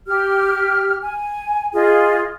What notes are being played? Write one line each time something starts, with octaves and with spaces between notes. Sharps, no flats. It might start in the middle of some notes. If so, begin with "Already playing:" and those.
G4 F6
G#5
F4 G#4 D#5